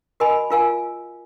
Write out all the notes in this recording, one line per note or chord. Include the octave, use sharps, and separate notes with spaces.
F#4 A#4 D#5 G#5 B5
F4 A#4 F5 G#5